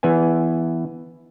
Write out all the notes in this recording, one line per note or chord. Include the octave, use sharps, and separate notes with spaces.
E3 B3 G#5